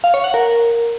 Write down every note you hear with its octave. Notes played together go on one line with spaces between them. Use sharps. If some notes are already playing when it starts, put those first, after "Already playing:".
F5
C#5
F#5
A#4